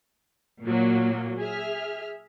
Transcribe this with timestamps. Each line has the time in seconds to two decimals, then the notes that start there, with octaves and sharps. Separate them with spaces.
0.63 A#2 F#3 A#3
1.39 G#4 E5 F6